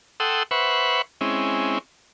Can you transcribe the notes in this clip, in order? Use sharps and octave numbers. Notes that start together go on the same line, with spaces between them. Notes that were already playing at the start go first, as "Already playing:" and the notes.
A4 F#5 G5 C6 D#6 E6
B4 C5 E5 F#5 B5 C#6
G#3 C4 C#4 E4